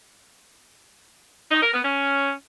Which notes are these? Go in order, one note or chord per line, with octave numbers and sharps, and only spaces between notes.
D#4
A#4
B3
C#4